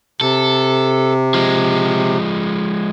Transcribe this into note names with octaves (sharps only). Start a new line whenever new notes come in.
C3 A4
F3 G#3